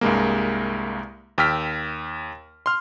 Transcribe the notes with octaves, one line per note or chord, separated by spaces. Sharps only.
C2 G2 G#3 A#3
D#2 G5 E6 F6 B6
C6 F6